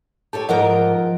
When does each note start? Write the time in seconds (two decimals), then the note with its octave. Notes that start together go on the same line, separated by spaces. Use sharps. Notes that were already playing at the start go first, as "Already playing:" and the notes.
0.33 G4 A4 C#5 A5
0.49 G#2 F3 A#4 D#5 F#5 G5